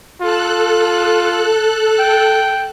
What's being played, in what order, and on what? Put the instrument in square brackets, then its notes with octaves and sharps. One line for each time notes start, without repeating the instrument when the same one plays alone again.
[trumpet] F4 [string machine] A4 F#6
[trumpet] G5